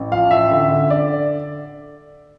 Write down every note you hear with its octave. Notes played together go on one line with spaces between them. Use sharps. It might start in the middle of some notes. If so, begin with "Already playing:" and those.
Already playing: A1
F3 F5
A1 E5
D3 E5
D3
D3 D5